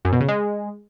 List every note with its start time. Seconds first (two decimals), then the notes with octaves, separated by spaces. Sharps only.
0.05 F#2
0.13 B2
0.21 C#3
0.28 G#3